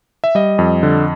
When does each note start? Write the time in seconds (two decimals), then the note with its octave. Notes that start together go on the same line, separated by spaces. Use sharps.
0.24 E5
0.35 G3 D#5
0.59 F2
0.83 D3